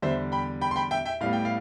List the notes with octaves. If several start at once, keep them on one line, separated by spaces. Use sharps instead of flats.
E2 D3 G3 C5 E5
G5 B5
G5 B5
C6
G5 B5
E5 G5
E5 G5
A2 G3 B3 F5
G5
F5